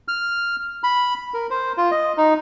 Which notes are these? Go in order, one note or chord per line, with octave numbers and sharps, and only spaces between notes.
F6
B5
A#4
C5
F4
D#5
D#4